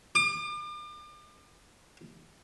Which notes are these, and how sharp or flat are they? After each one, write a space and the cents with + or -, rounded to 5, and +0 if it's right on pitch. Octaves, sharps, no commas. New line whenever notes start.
D6 +40